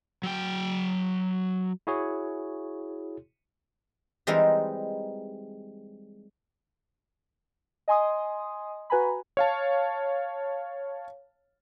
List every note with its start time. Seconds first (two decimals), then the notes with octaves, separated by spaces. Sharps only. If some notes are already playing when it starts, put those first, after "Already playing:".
0.23 F#3 G5
1.87 E4 F#4 G#4 C#5
4.27 E3 G3 G#3 C4 D#4 A#4
7.88 D#5 G#5 C6 D#6
8.90 F#4 B4 G#5 A#5 B5
9.37 C#5 F5 A5